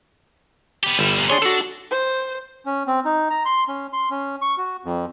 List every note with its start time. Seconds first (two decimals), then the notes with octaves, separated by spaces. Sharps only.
0.83 B3 G4
0.99 G1 G3 E4
1.17 D2 A#2
1.30 D4 G#4 C#5 C6
1.42 D4 F#4 A4
1.91 C5
2.66 C#4
2.87 C4
3.05 D#4
3.30 A#5
3.45 C6
3.68 C#4
3.93 C6
4.11 C#4
4.42 C#6
4.58 F#4
4.84 F2